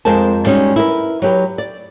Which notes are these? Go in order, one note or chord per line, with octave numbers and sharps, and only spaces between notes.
F2 G#3 A#4 C5 A5
G3 G#3 C#4 D#4 F#4
E4 A#4 B4
F#3 G4 B4
D5